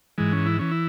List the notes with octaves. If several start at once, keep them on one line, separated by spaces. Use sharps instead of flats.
G#2 E3 G#3
C#4
E4
E3 C#4
E4